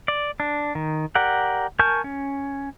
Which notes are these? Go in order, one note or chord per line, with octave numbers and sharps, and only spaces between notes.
D5
D4
D#3
G4 A#4 D5 F#5
A#4 G#5 A5 C#6 G6
C#4